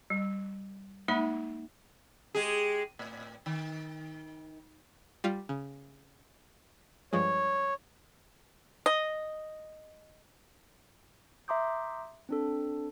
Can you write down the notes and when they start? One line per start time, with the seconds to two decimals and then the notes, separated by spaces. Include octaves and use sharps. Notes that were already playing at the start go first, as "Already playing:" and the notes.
0.10 G3
1.08 G#3 A#3 D#4 E5 B5
2.35 G#3 G4 G#4
2.99 A2
3.46 D#3
5.24 G3 F4
5.49 C#3
7.13 G2 F3 G#3 C#5
8.86 D#5
11.48 E5 A#5 C6 D6 D#6 G6
12.29 C4 D4 A4